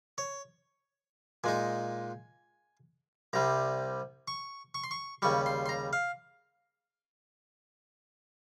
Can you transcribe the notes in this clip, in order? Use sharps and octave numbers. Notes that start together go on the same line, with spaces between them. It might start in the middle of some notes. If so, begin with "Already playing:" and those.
C#5
A#2 G#3 D#4 G#5
C2 C3 G3 A#5
C#6
C#6
C6
C#6
D#2 C#3 G3 C#6
C6
C6
A#5
F5